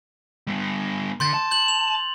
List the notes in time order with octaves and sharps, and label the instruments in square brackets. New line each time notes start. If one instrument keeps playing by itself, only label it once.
[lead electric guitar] G3 B3
[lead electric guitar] D3 [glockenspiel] C6 G6 A6
[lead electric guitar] A5
[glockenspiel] G6 F#7
F7